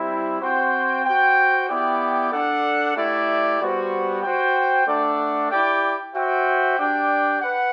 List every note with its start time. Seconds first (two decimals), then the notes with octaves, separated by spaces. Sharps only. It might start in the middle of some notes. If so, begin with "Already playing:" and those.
Already playing: G3 C4 E4
0.40 C4 F#4 C5 G5
1.04 F#4 C5 G5
1.68 B3 E4 G4 D5 G5
2.31 D4 A4 D5 F#5
2.95 A3 E4 G4 D5
3.59 G3 B3 F#4 C5
4.22 F#4 C5 G5
4.86 A3 D4 A4 D5 F#5
5.50 E4 G4 D5 G5
6.14 F#4 C5 E5 G5
6.78 D4 G4 D5 G5
7.41 B4 F#5